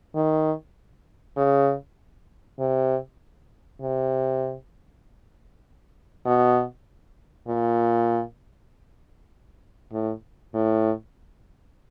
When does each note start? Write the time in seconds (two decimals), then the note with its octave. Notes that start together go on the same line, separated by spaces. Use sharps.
0.15 D#3
1.36 C#3
2.59 C3
3.81 C3
6.26 B2
7.48 A#2
9.93 A2
10.54 A2